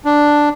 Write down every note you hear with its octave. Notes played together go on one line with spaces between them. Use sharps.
D4